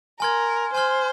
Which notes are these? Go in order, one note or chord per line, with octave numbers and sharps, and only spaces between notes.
A#4 G#5 C6 F6 G#6
C5 G#5 C6 F6 G#6